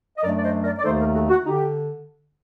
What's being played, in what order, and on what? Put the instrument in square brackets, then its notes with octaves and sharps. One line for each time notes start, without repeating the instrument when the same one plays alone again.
[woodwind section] D#5
F#2 F#3 A3 D4 A#4 D5
D5
C5 D#5
A#4 D5
D5
D#2 D#3 A3 D#4 A4 C5
G4 A#4
F#4 A4
F#4
D3 D#4 G4